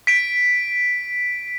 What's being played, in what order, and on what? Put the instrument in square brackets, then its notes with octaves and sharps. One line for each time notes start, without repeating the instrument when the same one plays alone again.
[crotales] B6 D7